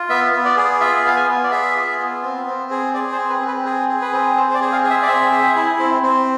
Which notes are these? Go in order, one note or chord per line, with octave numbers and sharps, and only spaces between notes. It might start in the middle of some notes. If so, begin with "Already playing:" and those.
Already playing: F4
B3 E5
B3
D5
G#4
F4 E5
B3 F5
G#5
B3
D5
G#4 E5
F4
B3
C4
C4
G#4
G#4 D5
C5
C4
B4
C4
B4
G#4
G#4
B4
C4
C4 C5
C5
D5
G#4
F5
G#4
E5
D5
C4 E5
G#4
E4
C4
C4